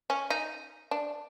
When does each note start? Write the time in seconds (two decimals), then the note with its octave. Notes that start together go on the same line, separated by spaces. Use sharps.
0.10 C#4
0.30 D#4
0.91 D4